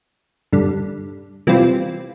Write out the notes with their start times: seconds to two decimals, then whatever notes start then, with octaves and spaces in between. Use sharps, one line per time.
0.53 G2 D3 G3
1.47 C3 E3 G3 C4 F4